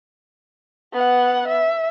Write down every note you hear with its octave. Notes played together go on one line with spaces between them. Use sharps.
B3 F#5
E5